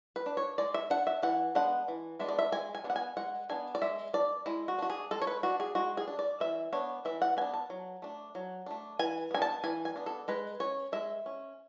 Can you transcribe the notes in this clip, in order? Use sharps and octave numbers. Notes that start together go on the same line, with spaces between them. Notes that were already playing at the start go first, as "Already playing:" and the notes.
B4
D4
C#5
G#3 D5
E5
D4 F#5
E5
E3 F#5
G#3 B3 D4 F#5
E3
G#3 B3 D4 E5
D5
E5
G#3 G#5
G#5
B3 D4
F#5
G#5
G#3 F#5
B3 D4 G#5
D5
G#3 E5
D4 D5
G#3 E4
F#4
D4 F#4
G#4
G#3 A4
C#5
B4
D4 F#4
G#4
G#3 F#4
G#4
D4
D5
E3 E5
B3 D4 C#5
E3 E5
F#5
B3 D4 G#5
A5
F#3
A3 D4
F#3
A3 D4
E3 G#5
B3 D4 G#5
A5
E3 G#5
G#5
B3 D4
A4
G#3 B4
C#4 C#5
G#3 E5
C#4